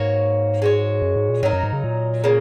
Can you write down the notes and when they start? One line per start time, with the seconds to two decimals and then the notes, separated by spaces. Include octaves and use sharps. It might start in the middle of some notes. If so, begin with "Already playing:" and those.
Already playing: G#2 A#3 F#4 C#5
0.62 G#3 F#4 C#5
1.02 F#2
1.16 G#2
1.29 A#2
1.43 G#2 F#3 D#4 A#4
1.53 F#2
1.63 G#2
1.73 C#3
1.84 A#2
2.24 C#3 A#3